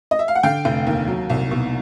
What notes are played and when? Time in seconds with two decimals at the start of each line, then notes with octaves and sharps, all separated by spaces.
0.11 D#5
0.19 E5
0.28 F5
0.35 F#5
0.43 D3 F5 G5
0.65 F1
0.87 D#2
1.08 F#3
1.30 C2
1.51 B2